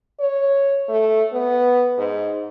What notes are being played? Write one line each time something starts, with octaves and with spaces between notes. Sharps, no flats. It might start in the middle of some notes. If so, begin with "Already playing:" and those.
C#5
A3
B3
G#2